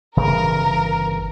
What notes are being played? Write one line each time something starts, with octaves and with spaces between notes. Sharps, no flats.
G1 C#3 E3 A#4